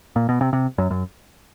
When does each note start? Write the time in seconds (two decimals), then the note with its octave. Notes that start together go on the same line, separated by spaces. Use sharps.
0.16 A#2
0.29 B2
0.41 C3
0.53 C3
0.78 F#2
0.91 F#2